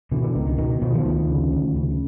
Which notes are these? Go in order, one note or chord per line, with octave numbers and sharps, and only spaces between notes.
B2 D3 E3
D3 E3
C#2 D#3
D#3
B2 D#3
D#3
B2 D#3 F3
D#3 F3
D2 D#3 F3
C#3
D2
C#3